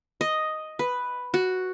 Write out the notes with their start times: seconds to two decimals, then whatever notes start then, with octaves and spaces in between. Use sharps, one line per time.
0.21 D#5
0.79 B4
1.34 F#4